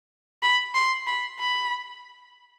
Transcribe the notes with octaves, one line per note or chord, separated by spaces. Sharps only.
B5
C6
B5
B5